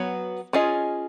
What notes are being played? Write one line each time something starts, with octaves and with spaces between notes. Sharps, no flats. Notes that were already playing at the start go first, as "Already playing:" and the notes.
Already playing: F#3 B3 F#4 C#5
C#4 F4 G#4 D#5